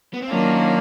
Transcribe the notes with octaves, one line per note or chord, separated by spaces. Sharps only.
B3
C4
D#3 F#3 A#3 C#4 D4 F4